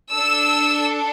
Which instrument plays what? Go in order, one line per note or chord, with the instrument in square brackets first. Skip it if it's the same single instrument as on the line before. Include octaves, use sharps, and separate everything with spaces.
[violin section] D4 A4 E6